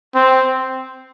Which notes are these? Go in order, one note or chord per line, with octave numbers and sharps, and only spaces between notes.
C4